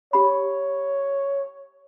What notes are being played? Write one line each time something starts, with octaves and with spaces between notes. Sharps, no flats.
G4 C#5 B5